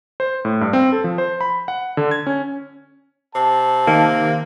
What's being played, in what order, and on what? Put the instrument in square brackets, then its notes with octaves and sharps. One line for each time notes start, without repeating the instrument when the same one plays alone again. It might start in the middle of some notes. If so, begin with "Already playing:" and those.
[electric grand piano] C5
A2
G2
C4
A4
F3
C5
B5
F#5
D3
G#6
C#4
[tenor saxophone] C3 [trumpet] A5
[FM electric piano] D#3 [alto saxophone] A#3